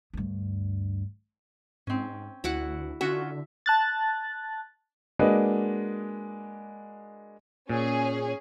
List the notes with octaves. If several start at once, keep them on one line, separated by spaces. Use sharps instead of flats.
D2 G2
G#2 C4 C#4
D2 E4 F#4 F#5
D3 C#4 F4 F#4 E5
A5 F#6 A6
G#3 A#3 D4 F#4 B4 D#5
A#2 C#4 G#4